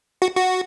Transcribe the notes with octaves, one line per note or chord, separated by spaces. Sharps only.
F#4
F#4